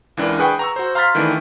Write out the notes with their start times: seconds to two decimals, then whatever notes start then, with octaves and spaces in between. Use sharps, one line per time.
0.17 C#2 E3 D4 A#4
0.39 G#4 B4 F#5 G5 C#6
0.59 A#5 C#6 E6
0.76 F#4 C5
0.95 F5 A#5 C6 F6 A6 B6
1.15 D#3 E3 A3 D4